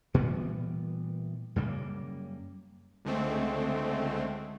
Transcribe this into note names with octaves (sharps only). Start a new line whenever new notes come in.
A#2 E3 G3 B3
F#2 C#3 G3 A#3
C#2 D3 G#3 A3 C4